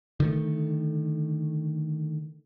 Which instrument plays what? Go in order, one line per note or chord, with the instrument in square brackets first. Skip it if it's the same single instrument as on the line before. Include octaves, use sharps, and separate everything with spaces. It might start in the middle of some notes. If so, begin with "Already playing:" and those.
[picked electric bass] D3 D#3 A3